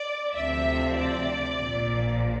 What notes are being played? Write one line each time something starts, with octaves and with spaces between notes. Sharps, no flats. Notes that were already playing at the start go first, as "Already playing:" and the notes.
Already playing: D5
D2 C3 F3 C4 E5
D5
A#1 A#2 F3